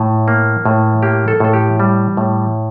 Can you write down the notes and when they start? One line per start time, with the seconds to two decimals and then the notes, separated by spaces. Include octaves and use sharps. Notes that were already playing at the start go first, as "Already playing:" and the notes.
Already playing: A2
0.28 A#3
0.65 A2
1.03 A#3 G4
1.28 A4
1.40 A2 A4
1.53 G4
1.80 G3
2.17 A2